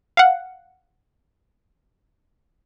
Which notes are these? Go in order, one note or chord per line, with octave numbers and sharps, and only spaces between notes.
F5 F#5